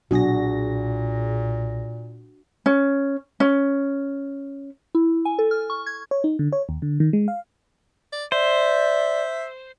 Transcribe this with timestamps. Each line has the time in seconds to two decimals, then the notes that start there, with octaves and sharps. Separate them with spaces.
0.11 B1 A#2 D4 F#4 G#4 A#6
2.66 C#4
3.40 C#4
4.95 E4
5.25 G#5
5.39 A4
5.51 F6
5.70 C#6
5.87 G#6
6.11 C#5
6.24 D#4
6.39 D3
6.52 C#5
6.69 D#2
6.82 D3
7.00 D#3
7.13 G#3
7.28 F5
8.13 D5
8.32 C5 D5 E5